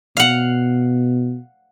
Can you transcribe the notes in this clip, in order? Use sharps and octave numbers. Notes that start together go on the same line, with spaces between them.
B2 F5 F#5